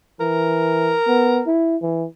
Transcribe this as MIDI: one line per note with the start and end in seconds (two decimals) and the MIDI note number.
0.20 0.96 52
0.20 1.51 70
1.08 1.42 59
1.47 1.77 64
1.82 2.06 52